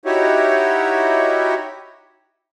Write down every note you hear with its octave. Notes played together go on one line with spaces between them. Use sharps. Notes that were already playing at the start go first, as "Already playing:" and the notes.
D#4 E4 F#4 G4 C#5